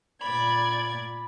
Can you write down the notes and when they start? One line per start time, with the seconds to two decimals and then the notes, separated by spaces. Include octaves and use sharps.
0.21 A#2 D5 B5 G#6